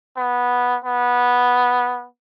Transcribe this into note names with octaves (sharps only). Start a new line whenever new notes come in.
B3
B3